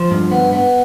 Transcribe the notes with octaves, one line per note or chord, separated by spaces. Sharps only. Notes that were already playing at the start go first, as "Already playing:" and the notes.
Already playing: F3 C5
G2
B3
B3